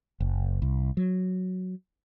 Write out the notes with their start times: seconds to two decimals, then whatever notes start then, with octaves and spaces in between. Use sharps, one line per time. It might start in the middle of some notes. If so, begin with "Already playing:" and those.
0.20 F#1
0.62 C2
0.97 F#3